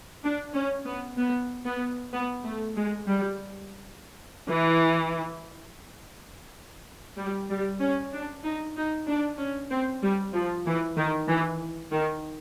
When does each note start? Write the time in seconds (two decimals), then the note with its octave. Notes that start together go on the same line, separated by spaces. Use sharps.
0.23 D4
0.54 C#4
0.85 B3
1.17 B3
1.65 B3
2.13 B3
2.44 A3
2.76 G#3
3.07 G3
4.49 E3
7.18 G3
7.49 G3
7.80 C#4
8.12 D4
8.44 D#4
8.75 D#4
9.08 D4
9.38 C#4
9.70 C4
10.02 G3
10.33 F3
10.66 E3
10.97 D#3
11.28 E3
11.91 D#3